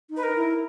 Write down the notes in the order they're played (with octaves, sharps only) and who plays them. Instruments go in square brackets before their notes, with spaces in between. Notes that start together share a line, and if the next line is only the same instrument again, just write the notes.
[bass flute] D#4
[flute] B4
A#4
[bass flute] E4